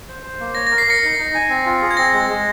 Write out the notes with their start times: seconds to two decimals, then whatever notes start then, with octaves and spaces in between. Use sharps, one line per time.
0.08 C5
0.23 C5
0.40 A#3
0.55 C#5 A#6
0.67 A#4 A#6
0.78 C7
0.87 A#4 A#6 C#7
1.03 D#4 C7
1.19 D#4
1.35 G#5
1.50 C4
1.66 F4
1.82 G#4
1.91 G#6
1.97 C4 A#6
2.13 G#3
2.29 G#3